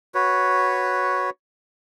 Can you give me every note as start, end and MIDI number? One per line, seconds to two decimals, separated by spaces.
0.15 1.30 66
0.15 1.30 71
0.15 1.30 73